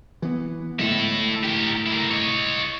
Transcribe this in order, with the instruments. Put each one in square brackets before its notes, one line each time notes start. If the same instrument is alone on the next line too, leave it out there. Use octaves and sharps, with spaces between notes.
[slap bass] E3 B3
[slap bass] A2 D3 G#3 [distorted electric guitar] E4 A4
[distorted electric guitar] G4 A#4
A#3 E4
C#5 D#5